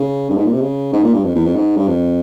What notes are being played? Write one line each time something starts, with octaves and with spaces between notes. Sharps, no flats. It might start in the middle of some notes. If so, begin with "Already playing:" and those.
Already playing: C#3
G2
G#2
A#2
C3
C#3
G#2
A#2
G2
F2
E2
F2
G#2
G2
F2